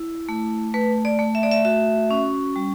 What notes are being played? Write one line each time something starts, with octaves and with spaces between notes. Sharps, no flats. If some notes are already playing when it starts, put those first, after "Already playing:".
Already playing: E4
A3
A3 B4
D5
A3
E5
D5
E5
F#4 E5
C#4
G3